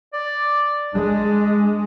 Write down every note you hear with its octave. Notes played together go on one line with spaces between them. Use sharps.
D5
G#3 D4